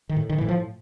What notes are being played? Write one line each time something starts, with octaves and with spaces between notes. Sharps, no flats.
D#3
A2
D#3
A2 E3
F3